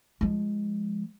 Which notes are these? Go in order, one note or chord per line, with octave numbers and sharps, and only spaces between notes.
F3 G#3